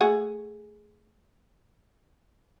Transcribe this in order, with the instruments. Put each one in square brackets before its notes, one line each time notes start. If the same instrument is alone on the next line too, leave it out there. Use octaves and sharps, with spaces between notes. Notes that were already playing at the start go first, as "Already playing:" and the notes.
[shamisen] A3 G#4 F#5